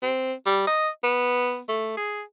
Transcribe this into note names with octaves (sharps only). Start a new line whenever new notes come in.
C4
G3
D#5
B3
A3
G#4